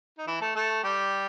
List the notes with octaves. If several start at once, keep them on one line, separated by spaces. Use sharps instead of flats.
D#4
E3 E4
A3 A4
A3 A4
G3 G4